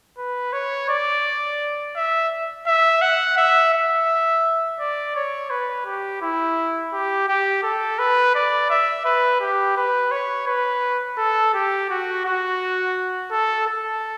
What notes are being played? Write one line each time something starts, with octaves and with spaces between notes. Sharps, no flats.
B4
C#5
D5
E5
E5
F#5
E5
E5
D5
C#5
B4
G4
E4
G4
G4
A4
B4
D5
E5
B4
G4
B4
C#5
B4
A4
G4
F#4
F#4
A4
A4